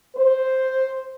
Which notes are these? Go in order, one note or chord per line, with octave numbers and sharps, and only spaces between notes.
C5